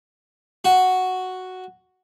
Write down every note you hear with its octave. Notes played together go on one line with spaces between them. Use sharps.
F#4